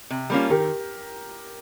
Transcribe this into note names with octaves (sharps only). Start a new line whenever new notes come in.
C3
G3 A#3 C#4 F4
D#3 G4 A#4